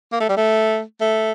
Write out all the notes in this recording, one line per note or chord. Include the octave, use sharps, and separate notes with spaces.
A#3
A3
G3
A3
A3